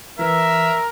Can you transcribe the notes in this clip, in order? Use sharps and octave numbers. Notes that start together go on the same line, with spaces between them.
E3 A#4 E5